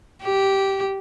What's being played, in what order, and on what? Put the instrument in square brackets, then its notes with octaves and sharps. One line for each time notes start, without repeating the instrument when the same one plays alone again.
[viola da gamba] G4